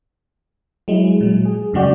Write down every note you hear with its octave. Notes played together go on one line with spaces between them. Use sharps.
F#3 G#3 E4
A#2 F#3
G#4
F#2 C#3 G#3 F#4 D5 G5